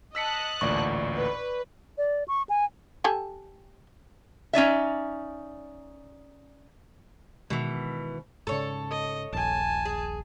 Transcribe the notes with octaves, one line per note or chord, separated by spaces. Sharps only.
D#5 A5 E6 F#6 B6 C#7
A1 D2 A#2 D5 C#6
B4
D5
C#6
G#5
G4 A4 G#5
C#4 D#4 D5 E5
B2 D#3 E3 G#3
G#2 C#3 A4 C#5
D#5
D#1 A#1 G#5 A5
G#4